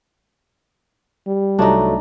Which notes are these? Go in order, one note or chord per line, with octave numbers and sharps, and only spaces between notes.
G3
C2 F#3 A3 D4 D#4